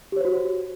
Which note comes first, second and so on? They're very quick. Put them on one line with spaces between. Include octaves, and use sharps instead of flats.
G4 C#5 C5 F#4